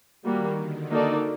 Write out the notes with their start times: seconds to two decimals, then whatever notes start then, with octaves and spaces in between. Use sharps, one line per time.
0.25 D#3 G3 A#3 F#4
0.58 D3
0.91 D3 A#3 D#4 F#4 A4 D5